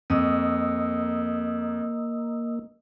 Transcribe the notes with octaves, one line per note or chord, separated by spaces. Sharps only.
F2 A#3 D#5 D#6 E6